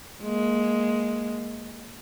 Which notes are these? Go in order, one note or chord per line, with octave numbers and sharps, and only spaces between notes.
G#3 A#3